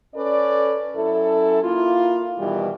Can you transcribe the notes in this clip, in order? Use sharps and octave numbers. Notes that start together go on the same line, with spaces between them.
C#4 A4 B4 D5
F#2 C#4 E4 A4
A#3 E4 F4
B2 D#3 E3 G3